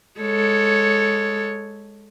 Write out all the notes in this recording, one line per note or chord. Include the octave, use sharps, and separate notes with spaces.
G#3 A4 C#5